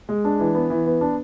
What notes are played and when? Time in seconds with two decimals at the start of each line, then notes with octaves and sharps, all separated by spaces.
0.09 G#3
0.25 D4
0.39 E3
0.55 B3
0.70 E3
0.86 B3
1.01 D4